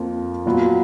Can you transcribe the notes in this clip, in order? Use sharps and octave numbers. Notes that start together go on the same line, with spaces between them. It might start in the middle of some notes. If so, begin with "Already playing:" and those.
Already playing: F2 F3 A#3
A#2 F#3 B3 F4